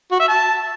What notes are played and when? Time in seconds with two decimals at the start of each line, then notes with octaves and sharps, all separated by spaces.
0.11 F#4
0.20 E5
0.28 A5